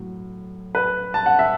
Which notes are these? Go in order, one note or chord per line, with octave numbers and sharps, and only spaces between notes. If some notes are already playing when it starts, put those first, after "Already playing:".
Already playing: A2 F#3
B4
A5
F#5
E5